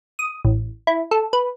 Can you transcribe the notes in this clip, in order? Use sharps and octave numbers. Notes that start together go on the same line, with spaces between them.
D#6
A1
E4
A4
B4